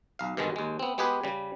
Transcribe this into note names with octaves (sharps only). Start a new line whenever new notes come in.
B1 F5
G2 B2 D3 D#3 G#3
D#2 G#3
B3 C4
G#3 B3 G4 G#4 B4
C#3 G3